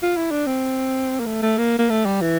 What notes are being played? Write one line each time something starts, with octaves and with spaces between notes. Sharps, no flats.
F4
E4
D4
C4
A#3
A3
A3
A#3
A#3
A3
G3
E3